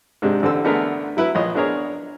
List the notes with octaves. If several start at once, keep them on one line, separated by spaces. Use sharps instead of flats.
G#2 C3 G#3 D4
A1 D3 C4 A4 E6
D3 A3 B3 D4 G#4 A#4
F#3 E4 B4
A#1 C#5 D#5
B3 D4 G#4 A#4 C#5